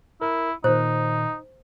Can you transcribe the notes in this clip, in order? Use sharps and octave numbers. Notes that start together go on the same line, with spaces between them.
E4 A#4
A#2 D#3 D#4 C5